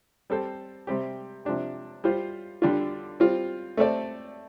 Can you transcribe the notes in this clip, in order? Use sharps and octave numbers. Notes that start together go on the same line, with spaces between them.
G3 C4 A4 C5
C3 G3 C4 G4
C3 F3 D4 G4
G3 F4 C5
D3 G3 D4 F4
G3 C4 F4
A3 C4 A4 D5